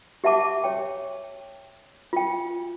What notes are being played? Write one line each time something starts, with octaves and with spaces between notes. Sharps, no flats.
G4 E5 F#5 A5 D6
G4 C#5 G5
F4 G5